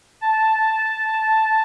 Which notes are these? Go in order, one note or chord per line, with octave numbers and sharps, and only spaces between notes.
A5